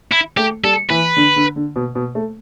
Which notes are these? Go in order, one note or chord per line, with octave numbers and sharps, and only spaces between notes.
E4
A3 G4
G3 A4
E3 B4
D3
D3
D3
B2
B2
A3